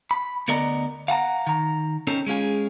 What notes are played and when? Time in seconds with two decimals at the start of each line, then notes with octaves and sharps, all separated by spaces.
0.11 B5
0.48 D2 B3 A#4 D5 D#5 A#5
1.08 F5 F#5 A5 A#5
1.47 D#3 A#5
2.07 C4 C#4 D#4 A4 A#4
2.26 G#3 C#4 F4 G#4